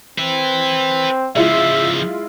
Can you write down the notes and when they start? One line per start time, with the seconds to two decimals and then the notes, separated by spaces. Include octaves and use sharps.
0.18 C4 B4 E5
1.36 C#3 F3 G#3 E4 F4 E5